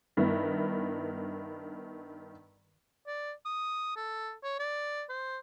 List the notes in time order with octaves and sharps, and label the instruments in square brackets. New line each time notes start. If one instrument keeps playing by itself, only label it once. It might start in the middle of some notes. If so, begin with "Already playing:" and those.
[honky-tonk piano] G2 D#3 B3 E4
[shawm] D5
D#6
A4
C#5
D5
C5